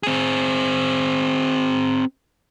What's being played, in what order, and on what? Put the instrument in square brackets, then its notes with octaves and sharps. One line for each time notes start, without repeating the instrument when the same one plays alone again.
[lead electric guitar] C4 G#4